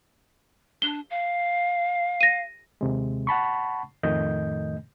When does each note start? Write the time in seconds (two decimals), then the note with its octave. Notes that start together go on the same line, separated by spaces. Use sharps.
0.82 D4 G7
1.10 F5
2.21 A#6 D#7
2.81 D#2 C3 G#3
3.27 F#5 A5 B5 C#6
4.03 F2 A2 D#3 A3 D#5 G6